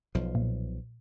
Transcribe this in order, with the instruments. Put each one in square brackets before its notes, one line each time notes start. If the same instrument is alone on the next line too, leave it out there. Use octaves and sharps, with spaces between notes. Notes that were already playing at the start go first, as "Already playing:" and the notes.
[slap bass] B1 F3
[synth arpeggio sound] A#2